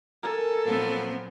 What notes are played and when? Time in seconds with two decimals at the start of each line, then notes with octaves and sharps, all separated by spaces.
0.23 A4 A#4 G#5
0.65 A#2 F3 F#3 B3 C4